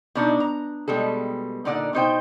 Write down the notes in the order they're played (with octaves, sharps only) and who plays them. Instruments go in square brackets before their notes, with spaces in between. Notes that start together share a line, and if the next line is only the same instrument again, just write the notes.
[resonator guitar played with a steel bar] B2 D4 D#4
A#5
B2 G3 G#3 A4
A#2 D3 D#4 D5 F#5
B2 D#4 C5 G5